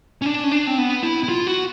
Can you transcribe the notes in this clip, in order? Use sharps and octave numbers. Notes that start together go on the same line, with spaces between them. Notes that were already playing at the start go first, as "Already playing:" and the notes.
C#4
D4
C#4
D4
C4
B3
E4
E4
F4
F#4